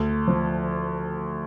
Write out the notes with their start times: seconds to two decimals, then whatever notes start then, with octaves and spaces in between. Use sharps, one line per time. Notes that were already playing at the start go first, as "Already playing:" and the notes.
Already playing: D2
0.28 F3